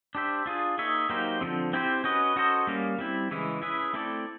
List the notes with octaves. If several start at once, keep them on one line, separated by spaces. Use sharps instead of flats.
D4 G4 C5 E5
D4 F4 G#4
A#3 D#4 G#4 C#5 E5
F#3 A#3 D#4 G4 C5
D3 F3 G#3 C4
C4 E4 G4 C5
C#4 F#4 B4 D#5
C#4 F#4 A4 C5 D#5
G3 A#3 C#4
G3 C4 E4
C#3 E3 G#3 C#4 E4
C#4 E4 G#4 B4 E5
A3 C4 E4 A4 D5